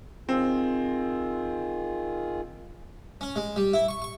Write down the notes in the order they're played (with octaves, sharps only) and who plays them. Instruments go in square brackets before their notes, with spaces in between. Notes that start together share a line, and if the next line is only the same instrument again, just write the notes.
[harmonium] D#3 F4 G#4 [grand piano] C4
[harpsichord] C#4
G#3
G3
E4
C#6
C#6